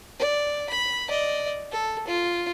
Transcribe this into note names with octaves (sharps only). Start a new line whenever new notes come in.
D5
B5
D5 D#5
A4
F4